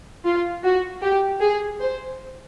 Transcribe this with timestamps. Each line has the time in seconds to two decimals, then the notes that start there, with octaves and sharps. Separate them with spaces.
0.25 F4
0.64 F#4
1.02 G4
1.41 G#4
1.80 C5